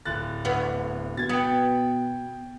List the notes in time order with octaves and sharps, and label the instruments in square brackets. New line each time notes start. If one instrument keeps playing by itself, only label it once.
[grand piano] D1 F#6 A6
[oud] D2 B3 F5
[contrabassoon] B2 [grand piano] G#6 A6
[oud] B3 [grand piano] G5 D#6